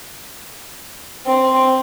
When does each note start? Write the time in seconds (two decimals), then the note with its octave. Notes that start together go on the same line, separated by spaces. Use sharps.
1.27 C4